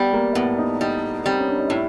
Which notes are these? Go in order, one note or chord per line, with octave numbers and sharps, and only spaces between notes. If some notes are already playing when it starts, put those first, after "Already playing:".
Already playing: G3 B3
A#3
A2 B3
D#4
G3 D#4
G3 C4
C#4
D4
D#4
A2 E4